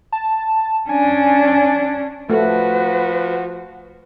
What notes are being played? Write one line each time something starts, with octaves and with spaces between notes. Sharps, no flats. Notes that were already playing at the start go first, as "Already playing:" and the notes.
A5
C#4 D4 G#5
F3 A3 F#4 B4